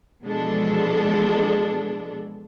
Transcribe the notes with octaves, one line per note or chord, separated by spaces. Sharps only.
B2 E3 F3 G#3 D4 A4